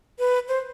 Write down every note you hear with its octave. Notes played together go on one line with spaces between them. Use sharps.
B4
C5